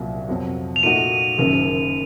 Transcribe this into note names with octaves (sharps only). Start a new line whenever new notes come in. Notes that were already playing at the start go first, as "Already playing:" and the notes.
Already playing: C2 A#2 F#3
F2 C3 F#3
F7
A#2 A3 D#4 F#4 D#7
F#1 F#2 D#3 A#3